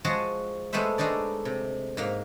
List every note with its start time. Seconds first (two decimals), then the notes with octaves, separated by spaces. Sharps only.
0.04 F3 G#3 F#4 G#4 A5
0.73 G#3 A3 B3 B4 C5 E5
0.98 G#3 A3 D4 D#4 D5
1.45 C3
1.97 G#2 A#3 F5